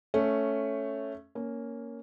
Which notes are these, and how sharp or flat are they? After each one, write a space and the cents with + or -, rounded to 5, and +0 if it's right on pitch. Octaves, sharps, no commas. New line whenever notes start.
A3 +0 C#4 +0
A#3 +0 C#4 +10